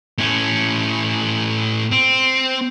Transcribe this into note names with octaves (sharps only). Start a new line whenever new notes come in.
A2 C#4
C4